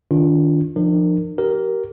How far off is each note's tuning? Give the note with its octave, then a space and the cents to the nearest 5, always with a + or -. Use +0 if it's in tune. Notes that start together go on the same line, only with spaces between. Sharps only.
D#3 +0 D4 -30 F4 +0
F3 +0 D4 +45 A#4 -15
G4 -25 A#4 +0